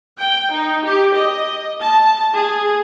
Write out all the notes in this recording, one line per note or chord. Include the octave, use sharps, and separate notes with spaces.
G5
D#4
G4
D#5
A5
G#4